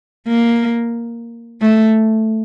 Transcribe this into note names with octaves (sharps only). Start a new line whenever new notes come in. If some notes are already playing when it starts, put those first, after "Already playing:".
A#3
A3